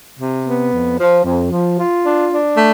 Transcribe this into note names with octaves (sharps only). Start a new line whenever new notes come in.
C3
B3
F2
F3
F2
F3
F4
D4
D4
A3